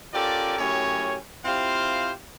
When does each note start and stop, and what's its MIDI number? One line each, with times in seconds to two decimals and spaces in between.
0.14 0.56 61
0.14 0.56 65
0.14 0.56 67
0.14 0.56 69
0.14 0.56 70
0.14 0.56 74
0.59 1.16 42
0.59 1.16 45
0.59 1.16 61
0.59 1.16 67
0.59 1.16 73
1.45 2.12 60
1.45 2.12 64
1.45 2.12 65
1.45 2.12 67
1.45 2.12 72
1.45 2.12 77